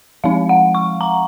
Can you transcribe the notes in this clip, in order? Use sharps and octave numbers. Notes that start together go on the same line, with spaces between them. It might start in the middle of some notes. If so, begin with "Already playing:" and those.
F3 G#3 C4 D#4 F5
F#5
C#6
A#5